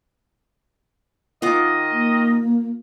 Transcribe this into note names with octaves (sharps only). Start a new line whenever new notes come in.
D#3 F4 D#5 F#5 D6
A#3